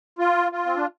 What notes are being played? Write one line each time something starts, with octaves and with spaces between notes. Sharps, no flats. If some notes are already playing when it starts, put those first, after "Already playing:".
F4
F4
C4
D4